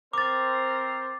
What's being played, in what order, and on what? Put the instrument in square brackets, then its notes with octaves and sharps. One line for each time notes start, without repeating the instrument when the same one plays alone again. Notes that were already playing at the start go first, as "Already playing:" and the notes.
[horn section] C4 A#4 C5 [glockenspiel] D6 A6